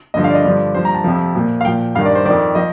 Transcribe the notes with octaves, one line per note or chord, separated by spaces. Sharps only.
G2 D3 F3 D#5
F5
D5
D#5
G2 D3 F3 D5
G2 F3 C5
A#5
A5
F2 C3 F3
A#2 F3
F5
A#2 F3 G5
G2 D#3 F5
D5
C5
F2 D#3 D5
F3 D#5